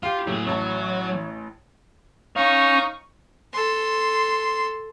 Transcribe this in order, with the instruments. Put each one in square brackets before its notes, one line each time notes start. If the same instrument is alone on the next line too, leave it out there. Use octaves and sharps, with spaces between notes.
[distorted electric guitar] F4 [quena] G4 [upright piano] F5
[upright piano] A2 [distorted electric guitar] F#3 G#4
[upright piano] A1 A5 [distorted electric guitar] F#3 [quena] C#5
[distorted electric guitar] C#4 C#5 [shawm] D#4 [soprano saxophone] F5 [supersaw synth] C#6
[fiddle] A4 C6